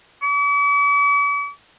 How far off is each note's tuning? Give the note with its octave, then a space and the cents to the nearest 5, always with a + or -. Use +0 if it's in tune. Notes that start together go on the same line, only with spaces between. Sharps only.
D6 -45